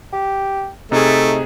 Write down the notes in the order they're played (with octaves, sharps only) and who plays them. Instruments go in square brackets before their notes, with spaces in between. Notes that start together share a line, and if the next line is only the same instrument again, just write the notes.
[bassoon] G4
[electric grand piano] C3 G#4 [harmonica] A3 [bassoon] D#4